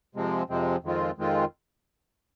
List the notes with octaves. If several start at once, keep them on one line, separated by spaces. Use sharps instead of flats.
F2 C3 F3 G#3 C4
F2 C3 F3 G#3 C4
F2 D#3 G#3 C4 F4
F2 D#3 G#3 C4 F4